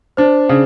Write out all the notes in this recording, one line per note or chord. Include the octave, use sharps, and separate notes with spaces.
D4 C5
C#3